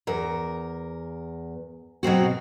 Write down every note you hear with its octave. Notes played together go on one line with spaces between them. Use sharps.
E2 A#4
B2 F#3 C4 F#4